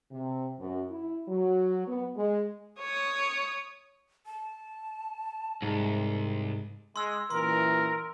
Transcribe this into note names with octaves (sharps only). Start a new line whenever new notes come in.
C3
F#2
E4
F#3
B3
G#3
C#5 D#6
A5
C2 G#2
G#3 C6 E6
F#2 A#2 E3 A#4 C6